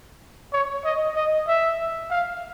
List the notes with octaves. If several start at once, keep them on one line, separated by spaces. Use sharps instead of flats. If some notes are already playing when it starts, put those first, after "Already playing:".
C#5
D#5
D#5
E5
F5